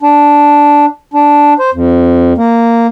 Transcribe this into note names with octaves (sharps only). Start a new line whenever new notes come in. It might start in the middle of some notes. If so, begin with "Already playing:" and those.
D4
D4
C5
F2
A#3